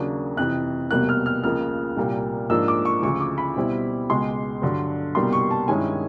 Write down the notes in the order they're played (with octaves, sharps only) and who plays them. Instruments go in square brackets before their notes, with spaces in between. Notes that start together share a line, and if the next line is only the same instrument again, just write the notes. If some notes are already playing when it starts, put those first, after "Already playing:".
Already playing: [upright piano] D#2 C#3 F#3 A#3 D4
F2 C3 E3 F#6
F1 E2 B2 G3 A#3 F#6
F6
F6
C#2 C#3 F3 A#3 F6
C2 A#2 G3 A#3
G#2 F3 A#3 D4 E6
D6
C#6
D2 C#3 F3 C#6
D6
B5
B1 B2 G3 C4 E4
C#2 B2 G#3 C6
G2 D3 F#3
C2 B2 G3 A#3 C6
C#6
A5
G2 D#3 G#3 C#4 E4 G#5